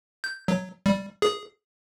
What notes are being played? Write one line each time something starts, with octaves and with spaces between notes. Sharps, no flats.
G6
F#3
G3
G#4